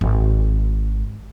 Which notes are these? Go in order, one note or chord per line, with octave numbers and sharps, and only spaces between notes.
G#1